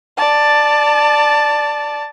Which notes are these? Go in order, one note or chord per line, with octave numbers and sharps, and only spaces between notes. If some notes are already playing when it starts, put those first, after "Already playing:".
D5 A5